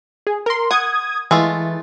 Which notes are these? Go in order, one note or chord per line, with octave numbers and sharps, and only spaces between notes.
G#4
A#4 C6
F#5 D#6 G#6
E3 G#3 A3 F4